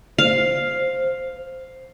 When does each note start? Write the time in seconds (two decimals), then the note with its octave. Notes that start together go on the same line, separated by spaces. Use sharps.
0.18 C5 F5